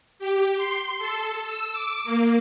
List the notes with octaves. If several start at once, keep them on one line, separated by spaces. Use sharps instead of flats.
G4
C6
A4
E6
D6
A#3